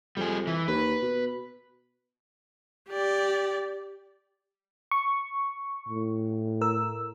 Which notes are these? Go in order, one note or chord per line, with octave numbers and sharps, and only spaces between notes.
F2 G3 G#4
E3
D#2 B4
B2
G4 D5
C#6
A2
A#4 E6